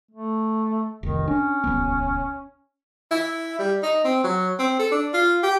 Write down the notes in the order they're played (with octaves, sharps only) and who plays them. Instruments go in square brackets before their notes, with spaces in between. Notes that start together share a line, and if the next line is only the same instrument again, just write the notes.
[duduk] A3
[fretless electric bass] F1 C2 [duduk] D#3
[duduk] C#4 [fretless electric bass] D4
[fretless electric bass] D#1 C#2 B3
[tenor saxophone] E4
G3
D#4
C4
F#3
C4
A4
D4
F4
G4